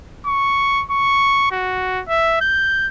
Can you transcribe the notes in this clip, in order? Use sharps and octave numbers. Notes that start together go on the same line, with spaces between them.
C#6
C#6
F#4
E5
G6